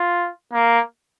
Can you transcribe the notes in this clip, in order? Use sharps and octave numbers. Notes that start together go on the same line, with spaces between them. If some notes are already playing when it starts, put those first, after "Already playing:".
Already playing: F4
A#3